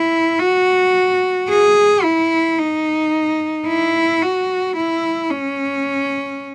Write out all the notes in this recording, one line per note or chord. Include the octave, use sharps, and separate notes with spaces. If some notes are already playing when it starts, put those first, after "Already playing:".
Already playing: E4
F#4
G#4
E4
D#4
E4
F#4
E4
C#4